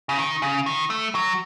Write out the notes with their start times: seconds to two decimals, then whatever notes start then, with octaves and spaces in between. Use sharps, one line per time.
0.09 C#3
0.18 D#3
0.42 C#3
0.66 D#3
0.90 A3
1.15 F#3